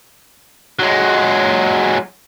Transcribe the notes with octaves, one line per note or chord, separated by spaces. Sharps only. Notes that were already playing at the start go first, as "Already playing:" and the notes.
F#3 G#3